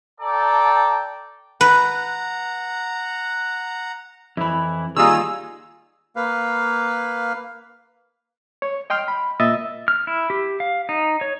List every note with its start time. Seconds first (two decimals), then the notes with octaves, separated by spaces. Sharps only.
0.20 A4 D5 G5 A5 A#5
1.61 B4 F#5 A#5
4.37 F2 E3 E4 B5
4.96 D#3 G3 A#3 D#4 F4 G#4 E6
6.16 A#3 B4 F5
8.62 C#5
8.90 D#5 G5 C6 F6
9.08 B5
9.40 A#2 D#5 E5 E6 A6
9.88 F6
10.07 E4
10.30 G4
10.60 F5
10.89 D#4
11.21 C#5